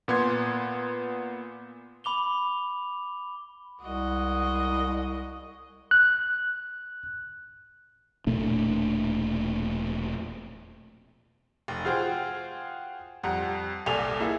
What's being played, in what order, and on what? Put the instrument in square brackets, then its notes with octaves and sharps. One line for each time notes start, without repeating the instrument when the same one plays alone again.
[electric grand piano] A#2 B3 C6 G#6
[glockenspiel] B5 D6 F7 G7
[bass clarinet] C2 [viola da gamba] G#3 F#4 D#5
[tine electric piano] F#6
[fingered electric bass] E1 A#2 A3 D4
[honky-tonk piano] F1
F4 F#4 G#4 C5 G5
F2 G3 F#5 A#5
F#1 C2 A4 D5 G#5 F7
A#3 E4 G#4 A4